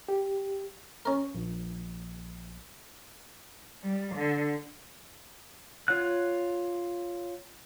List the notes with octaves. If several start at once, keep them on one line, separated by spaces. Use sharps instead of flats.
G4
C#4 A#4
A#1
G3
D3
F4 C#5 F#5 F#6